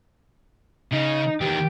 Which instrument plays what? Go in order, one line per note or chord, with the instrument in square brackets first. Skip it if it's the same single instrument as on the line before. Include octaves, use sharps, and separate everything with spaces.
[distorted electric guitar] C#3 [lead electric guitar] D#4
[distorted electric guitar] E2 D#3 [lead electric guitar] G4